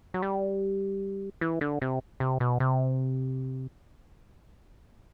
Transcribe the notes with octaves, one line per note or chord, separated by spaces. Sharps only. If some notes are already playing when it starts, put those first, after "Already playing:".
F#3
G3
E3
D3
C3
C3
B2
C3